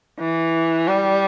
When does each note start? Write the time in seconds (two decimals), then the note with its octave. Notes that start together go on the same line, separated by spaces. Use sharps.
0.19 E3
0.88 G3